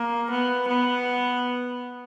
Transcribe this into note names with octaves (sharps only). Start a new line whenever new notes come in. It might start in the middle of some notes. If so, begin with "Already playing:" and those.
Already playing: A#3
B3
B3